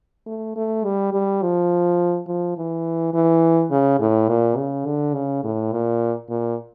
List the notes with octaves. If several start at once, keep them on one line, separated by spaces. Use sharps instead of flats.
A3
A3
G3
G3
F3
F3
E3
E3
C#3
A2
A#2
C#3
D3
C#3
A2
A#2
A#2